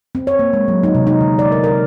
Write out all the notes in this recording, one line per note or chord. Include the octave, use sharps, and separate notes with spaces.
C4
C#5
A#3
G#3
F#3
D#4
C3
D#4
D3
D5
A#4
A#4